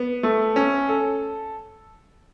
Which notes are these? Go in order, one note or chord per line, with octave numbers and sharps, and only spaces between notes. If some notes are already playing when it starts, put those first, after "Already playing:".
Already playing: B3
A3
C#4
A4